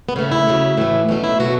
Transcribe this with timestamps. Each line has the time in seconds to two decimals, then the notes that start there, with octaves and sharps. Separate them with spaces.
0.09 B3
0.16 C#3 A3 C#4
0.32 E4
0.47 C#3 F#3 A3
0.78 A2 E3 A3
1.08 B2 F#3 A3 C#4
1.24 E4
1.40 B2 F#3 A3 F#4